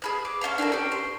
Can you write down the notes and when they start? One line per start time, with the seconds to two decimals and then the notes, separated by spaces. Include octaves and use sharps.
0.02 G#4 B5 F#6
0.25 D6
0.41 C#4 D#5 F5 A#5
0.58 D4 G4 A4 A#4
0.72 C#4 G4
0.91 A#5 C6